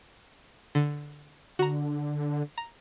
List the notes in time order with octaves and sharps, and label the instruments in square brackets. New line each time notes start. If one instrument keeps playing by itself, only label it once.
[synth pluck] D3
[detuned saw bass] D3 [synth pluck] F#4 A#5
[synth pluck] A#5